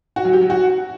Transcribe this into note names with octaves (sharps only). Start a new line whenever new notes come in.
F#4
F#3
G4
F#3
F#4